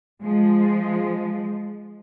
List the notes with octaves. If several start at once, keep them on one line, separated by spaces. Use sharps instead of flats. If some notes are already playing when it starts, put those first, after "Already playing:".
F3 G#3